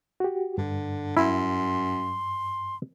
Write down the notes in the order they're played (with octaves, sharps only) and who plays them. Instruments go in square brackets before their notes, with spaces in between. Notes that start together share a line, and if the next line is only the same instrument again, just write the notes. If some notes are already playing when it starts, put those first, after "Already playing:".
[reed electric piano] F#4 G4
[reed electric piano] G2 [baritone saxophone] D3
[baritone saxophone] F#2 [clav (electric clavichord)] E4 [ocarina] C6